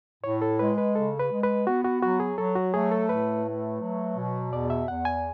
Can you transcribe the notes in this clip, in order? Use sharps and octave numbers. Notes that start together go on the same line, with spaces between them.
A2 C#5
A4
G#3 B4
B4
C#3 A4
B4
G#3
B4
B3 F#4
F#4
F#3 F#4
G#4
F#3 A4
F#4
A3 G#4
A4
A2 B4
A3
F#3
B2
E2 D5
E5
E2 F#5
G#5